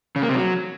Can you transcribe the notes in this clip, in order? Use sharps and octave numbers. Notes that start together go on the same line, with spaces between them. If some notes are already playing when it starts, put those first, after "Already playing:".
C#3
A#3
C3
F#3